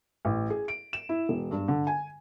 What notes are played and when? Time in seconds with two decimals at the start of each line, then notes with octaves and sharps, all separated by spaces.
0.25 A1
0.50 G#4
0.68 D7
0.93 E7
1.09 E4
1.29 E1
1.51 G2
1.68 D3
1.87 G#5